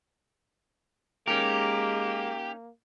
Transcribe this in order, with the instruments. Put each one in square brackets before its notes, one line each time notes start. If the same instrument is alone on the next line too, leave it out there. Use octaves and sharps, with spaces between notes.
[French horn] G#3 [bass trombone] A#3 [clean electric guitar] C#4 D#4 A#4 [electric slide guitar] G4